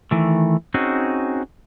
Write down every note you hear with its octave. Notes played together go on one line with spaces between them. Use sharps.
D#3 E3 A3
C4 C#4 D#4 F#4 G#4